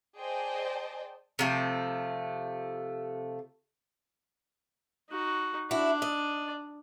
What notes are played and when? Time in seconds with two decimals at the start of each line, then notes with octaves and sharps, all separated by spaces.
0.18 G#4 C5 D5 D#5 G5 A5
1.39 C3 F3 A3
5.10 D#4 F#4
5.71 D4 E4 F#4 D5
6.02 D#5